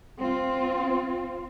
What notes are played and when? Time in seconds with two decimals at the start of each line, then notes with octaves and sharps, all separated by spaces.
0.19 C4 F4